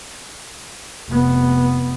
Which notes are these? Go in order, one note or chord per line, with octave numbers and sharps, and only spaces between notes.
F1 B3